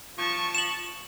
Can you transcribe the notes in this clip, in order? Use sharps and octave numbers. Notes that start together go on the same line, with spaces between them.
F3 A5 C#6
E7 F#7